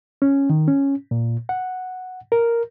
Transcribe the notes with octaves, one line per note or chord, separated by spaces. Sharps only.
C#4
D#3
C#4
A#2
F#5
A#4